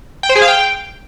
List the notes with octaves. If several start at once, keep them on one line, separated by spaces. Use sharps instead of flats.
G5
C5
G#4
F5
G5